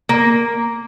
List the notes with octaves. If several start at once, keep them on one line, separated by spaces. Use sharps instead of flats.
A#3